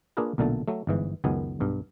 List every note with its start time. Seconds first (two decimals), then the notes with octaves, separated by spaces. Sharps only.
0.17 A#3 D4 F4 G#4 A#4 B4
0.38 B1 A#2 D3 A3 A5
0.68 F#3 A3
0.87 G1 G#2 E3
1.24 C#2 F#2 D#3 B3 G#5
1.60 B1 G2